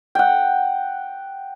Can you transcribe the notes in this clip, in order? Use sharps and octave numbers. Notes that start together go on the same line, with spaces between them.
F#5 G5